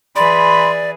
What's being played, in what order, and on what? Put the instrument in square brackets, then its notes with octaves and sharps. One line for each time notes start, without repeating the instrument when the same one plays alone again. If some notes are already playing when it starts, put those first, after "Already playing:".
[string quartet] E3 G#4 B4 [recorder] D5 [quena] B5 [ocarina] C6